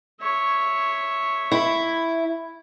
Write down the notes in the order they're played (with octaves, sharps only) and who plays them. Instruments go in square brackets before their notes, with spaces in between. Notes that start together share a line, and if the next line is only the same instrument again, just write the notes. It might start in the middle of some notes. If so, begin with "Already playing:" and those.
[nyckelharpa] C#5 E5
[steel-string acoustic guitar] E4